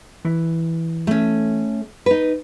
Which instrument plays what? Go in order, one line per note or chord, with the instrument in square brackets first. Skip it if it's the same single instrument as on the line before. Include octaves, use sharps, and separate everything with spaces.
[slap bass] E3
[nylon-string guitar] A3 C#4
D#4 B4